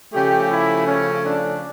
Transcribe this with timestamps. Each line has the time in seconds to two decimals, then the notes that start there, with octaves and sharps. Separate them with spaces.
0.13 C#3 F3 A3 G4
0.50 E4
0.86 C#4
1.23 D4